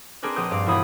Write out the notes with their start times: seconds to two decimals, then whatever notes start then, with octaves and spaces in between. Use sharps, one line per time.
0.23 C4 D4 G#4 A#4 B4
0.36 A#1 D#6 G6
0.51 G2 D5 F5
0.67 E1 E4 B5 D#6 G#6